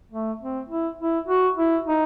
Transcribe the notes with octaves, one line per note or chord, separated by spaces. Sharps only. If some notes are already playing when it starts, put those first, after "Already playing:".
A3
C4
E4
E4
F#4
E4
D#4